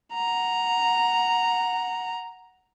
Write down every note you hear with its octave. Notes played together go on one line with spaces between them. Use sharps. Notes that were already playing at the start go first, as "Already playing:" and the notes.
F#5 A#5